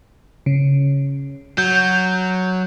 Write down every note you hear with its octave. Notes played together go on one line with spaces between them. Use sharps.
C#3
F#3 G6